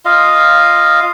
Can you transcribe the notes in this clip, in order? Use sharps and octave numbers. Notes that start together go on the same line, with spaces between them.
F4 D#5 F5